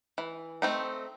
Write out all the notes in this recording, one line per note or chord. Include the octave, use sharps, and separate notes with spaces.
E3
A3 C4 D#4